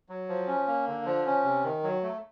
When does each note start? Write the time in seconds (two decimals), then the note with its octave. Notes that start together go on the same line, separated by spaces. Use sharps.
0.09 F#3
0.29 F3
0.47 C#4
0.67 A#3
0.87 D3
1.06 F3
1.26 C#4
1.44 C3
1.63 D#3
1.83 F#3
2.03 A3